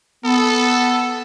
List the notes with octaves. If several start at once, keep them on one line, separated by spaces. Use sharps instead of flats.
B3 A4